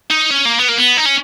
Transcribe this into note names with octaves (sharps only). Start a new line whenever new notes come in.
D#4
C#4
A#3
B3
A#3
B3
D#4
C#4